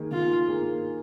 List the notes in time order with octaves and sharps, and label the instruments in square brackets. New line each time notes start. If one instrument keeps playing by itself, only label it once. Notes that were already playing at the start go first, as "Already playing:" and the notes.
Already playing: [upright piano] D#3 A#3 G#4
[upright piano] D#3 [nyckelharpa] F4
[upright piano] A#3 G#4